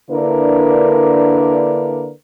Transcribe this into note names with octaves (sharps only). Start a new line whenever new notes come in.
D3 A#3 D4 E4 A#4 B4